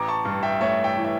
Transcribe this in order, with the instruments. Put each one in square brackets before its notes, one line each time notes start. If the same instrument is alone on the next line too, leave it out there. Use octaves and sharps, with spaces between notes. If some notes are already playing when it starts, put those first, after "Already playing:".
Already playing: [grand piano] A1 A#5 D6
A5 C#6
G2
E5 G5
A3 C#5 E5
E5 G5
E3
E5